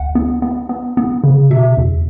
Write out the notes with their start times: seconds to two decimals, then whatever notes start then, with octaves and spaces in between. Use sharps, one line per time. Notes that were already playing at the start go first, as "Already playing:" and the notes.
Already playing: D2 F#5
0.15 B3
0.42 B3
0.69 B3
0.97 B3
1.24 C#3
1.50 B2 E5
1.77 E2